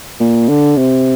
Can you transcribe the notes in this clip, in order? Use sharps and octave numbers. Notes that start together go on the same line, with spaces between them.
A#2
D3
C3